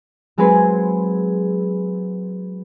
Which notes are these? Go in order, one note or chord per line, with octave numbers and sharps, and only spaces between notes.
F#3 G#3 C4 G#4 B4